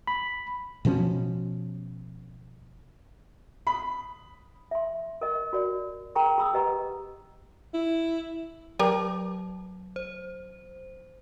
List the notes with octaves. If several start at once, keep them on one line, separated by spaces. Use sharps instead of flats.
B5
B2 F3 C4 C#4
B5
E5 C6
A#4 D#5
F#4 A#4 D5
G#4 A#4 G5 A#5 C#6
G#4 B5 D#6 E6
G4 G#4 B4 D#5 F#5 A#5
E4
F#3 G4 A#4 D5
C5